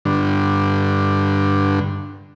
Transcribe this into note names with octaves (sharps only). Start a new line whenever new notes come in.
G2 D3